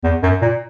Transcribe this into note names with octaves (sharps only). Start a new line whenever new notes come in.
E2
F#2
A#2